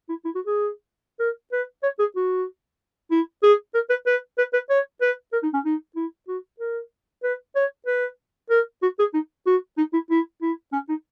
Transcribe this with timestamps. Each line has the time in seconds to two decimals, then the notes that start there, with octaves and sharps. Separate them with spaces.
0.09 E4
0.25 E4
0.35 F#4
0.47 G#4
1.20 A#4
1.52 B4
1.83 C#5
1.99 G#4
2.16 F#4
3.11 E4
3.43 G#4
3.74 A#4
3.90 B4
4.07 B4
4.38 B4
4.53 B4
4.70 C#5
5.01 B4
5.33 A#4
5.43 D#4
5.54 C#4
5.65 D#4
5.96 E4
6.28 F#4
6.60 A#4
7.23 B4
7.56 C#5
7.87 B4
8.50 A#4
8.82 F#4
8.99 G#4
9.14 D#4
9.47 F#4
9.78 D#4
9.93 E4
10.10 E4
10.42 E4
10.73 C#4
10.89 D#4